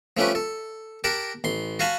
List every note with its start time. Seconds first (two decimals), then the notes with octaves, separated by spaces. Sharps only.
0.17 F3 A3 C#4 G4 B4
0.35 A4
1.04 G4 A#4 F#5 A5
1.44 A1 C6
1.79 F#4 F5 G#5 A5 B5